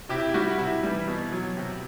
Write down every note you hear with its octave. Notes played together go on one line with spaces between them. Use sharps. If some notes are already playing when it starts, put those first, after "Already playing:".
C3 E4 G4
E4
G3 F#4
C3 E4
E3 G3
B2
F#3
C3